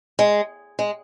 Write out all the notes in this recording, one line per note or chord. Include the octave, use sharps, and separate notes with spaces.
G#3
G#3